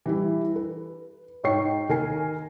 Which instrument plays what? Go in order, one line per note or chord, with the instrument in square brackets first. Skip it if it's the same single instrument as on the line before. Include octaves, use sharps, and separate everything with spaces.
[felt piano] E3 G3 E4
B4
G#2 D#4 C#5 G5 C#6 C7
D#2 A#4 G#5 C7